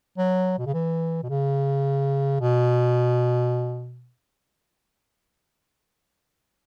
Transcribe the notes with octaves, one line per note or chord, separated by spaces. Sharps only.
F#3
B2
C#3
E3
B2
C#3
B2